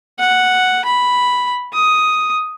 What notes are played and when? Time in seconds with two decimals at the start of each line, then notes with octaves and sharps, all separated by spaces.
0.19 F#5
0.85 B5
1.73 D#6